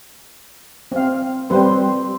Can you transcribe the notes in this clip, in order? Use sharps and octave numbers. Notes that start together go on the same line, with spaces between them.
C4 F5
G3 C4 B4 C6